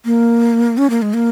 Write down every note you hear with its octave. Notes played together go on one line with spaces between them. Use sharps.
A#3
C#4
A#3
G#3
A#3